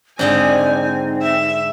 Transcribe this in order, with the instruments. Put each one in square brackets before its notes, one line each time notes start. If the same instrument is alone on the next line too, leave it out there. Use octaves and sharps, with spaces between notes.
[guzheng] G#2 D3 D#5 [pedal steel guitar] C4 [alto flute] D5 [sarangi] G#5
[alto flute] D#4
[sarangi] E5